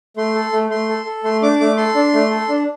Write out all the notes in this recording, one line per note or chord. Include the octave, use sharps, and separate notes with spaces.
A3 C6
A4
A3
A3 C6
A4
A4
A3 C6
D4 D6
A3 D6
A4 C6
D4
A3
A4
D4